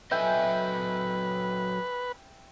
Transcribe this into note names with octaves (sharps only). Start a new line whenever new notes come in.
F#3 A4 B4 D#5 E5 G5 G#5